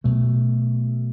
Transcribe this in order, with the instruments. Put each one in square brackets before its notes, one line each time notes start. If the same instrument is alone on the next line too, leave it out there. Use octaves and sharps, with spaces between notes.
[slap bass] B2 F#3 A3